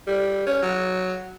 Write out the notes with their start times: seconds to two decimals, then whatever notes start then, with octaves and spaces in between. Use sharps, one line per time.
0.07 G3
0.47 C#4
0.62 F#3